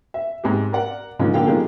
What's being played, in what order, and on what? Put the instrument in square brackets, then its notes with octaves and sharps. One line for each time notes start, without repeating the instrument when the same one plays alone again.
[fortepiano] E5
G#2 C4 G4
A#4 D5 F#5
G#2 D3 D#3 F3
A#1 D3 A#3 A4 F5 G5
B2 D#3 F3 G#3 G4 G#4